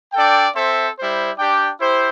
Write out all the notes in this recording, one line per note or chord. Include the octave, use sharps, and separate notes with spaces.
D4 A4 D5 G5
C4 A4 C5 E5
G3 E4 C5
D4 G4 D5 G5
E4 G4 C5